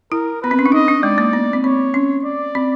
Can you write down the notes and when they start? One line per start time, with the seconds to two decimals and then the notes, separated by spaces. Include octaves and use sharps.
0.12 E4 A#4
0.42 B3 B4
0.51 C4
0.59 C#4
0.66 D4
0.72 D#4 D#5
0.88 D4
1.03 G#3 D5
1.18 A#3
1.33 B3
1.53 C4
1.64 C4 C#5
1.94 C#4
2.24 D5
2.55 C4